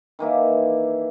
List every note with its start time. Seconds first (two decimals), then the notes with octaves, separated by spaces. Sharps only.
0.19 D#3 E3 A#3 E4